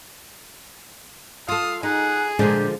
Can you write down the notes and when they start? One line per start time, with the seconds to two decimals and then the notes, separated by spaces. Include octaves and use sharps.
1.49 F4 A4 F5 D#6
1.83 D#4 G#4 F#5
2.39 A#2 D3 F3 G#3 D4 G4